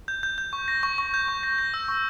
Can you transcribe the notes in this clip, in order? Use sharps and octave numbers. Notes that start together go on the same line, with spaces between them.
G6
G6
G6
C#6
A#6
C#6
C#6
G6
C#6
A#6
A#6
E6
C#6